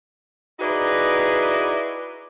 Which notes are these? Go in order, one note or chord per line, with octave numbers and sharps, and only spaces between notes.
D#4 E4 F#4 G#4 B4 D5